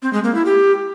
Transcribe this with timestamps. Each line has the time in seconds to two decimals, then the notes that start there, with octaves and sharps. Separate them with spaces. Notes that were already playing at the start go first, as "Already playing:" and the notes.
0.02 C4
0.13 G#3
0.24 A#3
0.35 E4
0.45 G4